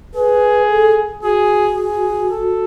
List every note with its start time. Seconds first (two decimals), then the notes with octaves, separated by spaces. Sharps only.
0.14 G#4 B4
0.69 A4
1.23 F#4 G#4
1.77 G#4
2.30 A4